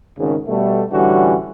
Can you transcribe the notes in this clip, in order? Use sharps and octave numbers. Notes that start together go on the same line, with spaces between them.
G#1 C#3
B2 G3 A3
A1 D3 E3 G3 C#4 F#4